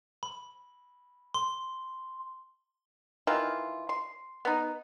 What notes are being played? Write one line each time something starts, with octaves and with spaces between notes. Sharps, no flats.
B5
C6
D#3 E3 F4
C6
B3 D#4